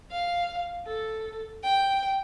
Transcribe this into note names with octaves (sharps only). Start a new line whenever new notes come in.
F5
A4
G5